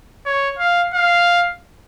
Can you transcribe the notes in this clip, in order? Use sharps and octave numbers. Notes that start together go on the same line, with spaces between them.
C#5
F5
F5